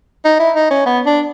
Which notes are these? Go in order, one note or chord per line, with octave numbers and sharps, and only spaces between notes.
D#4
E4
D#4
C#4
B3
D4